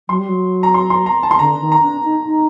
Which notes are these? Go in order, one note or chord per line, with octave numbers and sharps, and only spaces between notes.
F#3 C6
G3
F#3
A#5
C6
C6
A#5
A5
C6
D3 A#5
D#3
A#5
D4
D#4
D#4